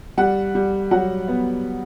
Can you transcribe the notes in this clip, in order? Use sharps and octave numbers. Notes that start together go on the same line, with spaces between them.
G3 F#5
G3
F#3 F#5
B3